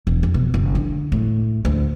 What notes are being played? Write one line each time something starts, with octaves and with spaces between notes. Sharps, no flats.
E1
F2
B2
F#1
D3
A2
D2